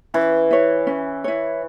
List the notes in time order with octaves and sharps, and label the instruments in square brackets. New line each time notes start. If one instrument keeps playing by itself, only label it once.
[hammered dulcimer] E3 [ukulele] C#4
[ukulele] E4 C#5
C#4
E4 C#5